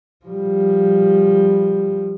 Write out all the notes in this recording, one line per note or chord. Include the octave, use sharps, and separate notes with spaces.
F3 G3